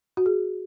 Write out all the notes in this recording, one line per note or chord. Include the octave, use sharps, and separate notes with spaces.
F#4
G#4